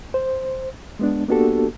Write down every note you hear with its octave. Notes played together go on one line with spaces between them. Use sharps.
C5
G#3 B3 D4
A#3 B3 D4 F#4 G4 A4